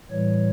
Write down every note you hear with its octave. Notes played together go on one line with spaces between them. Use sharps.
A2 E3 G3 C#5